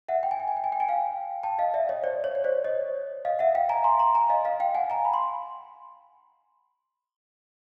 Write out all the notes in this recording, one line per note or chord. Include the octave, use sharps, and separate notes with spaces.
E5 F#5
G5
G#5
G5
G#5
G5
G#5
G5
G#5
F5 G5
G5 A5
D#5 F5
D5 E5
C#5 D#5
C5 D5
C#5
C#5
C5 D5
C#5 D#5
D#5 F5
E5 F#5
F5 G5
G#5 A#5
A#5 C6
A#5 C6
G#5 A#5
D#5 F5
D#5 F5
F5 G5
F#5 G#5
G#5 A#5
B5
C6